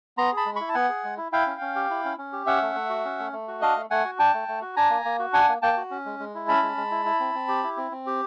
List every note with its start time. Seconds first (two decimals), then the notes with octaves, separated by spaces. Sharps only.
0.17 B3 A#5 C6
0.32 G#4 A5 B5
0.46 G#3
0.56 E4 B5 C#6
0.69 A5
0.74 B3 F#5 G#5
0.89 G#4
1.04 G#3
1.17 E4
1.32 E4 F5 G5
1.46 C#4
1.61 C#4
1.75 G4
1.90 E4
2.04 C#4
2.18 C#4
2.33 G4
2.46 C#4 E5 F#5
2.62 A3
2.75 A3
2.89 F#4
3.05 C#4
3.19 A3
3.33 A3
3.48 F#4
3.61 D4 D#5 F5
3.76 A3
3.90 A3 F#5 G#5
4.05 F#4
4.19 D4 G5 A5
4.34 A3
4.48 A3
4.62 F#4
4.76 D4 G#5 A#5
4.90 A#3
5.05 A#3
5.19 F#4
5.33 D4 F#5 G#5
5.49 A#3
5.62 A#3 G5 A5
5.77 F#4
5.91 C#4
6.05 G#3
6.19 G#3
6.35 E4
6.48 C#4 A5 B5
6.62 G#3
6.77 G#3
6.91 E4
7.06 E4
7.20 C4
7.35 C4
7.48 G4
7.63 E4
7.77 C4
7.91 C4
8.07 G4